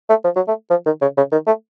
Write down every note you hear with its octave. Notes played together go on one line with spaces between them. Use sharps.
A3
F3
F#3
A3
F3
D#3
C#3
C#3
D#3
A3